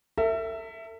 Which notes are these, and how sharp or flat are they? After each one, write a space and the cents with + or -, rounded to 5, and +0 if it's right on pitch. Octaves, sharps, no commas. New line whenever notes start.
A4 +45 E5 +0